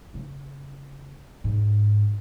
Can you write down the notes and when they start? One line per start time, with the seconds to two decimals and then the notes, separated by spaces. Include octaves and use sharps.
0.14 C#3
1.44 G#2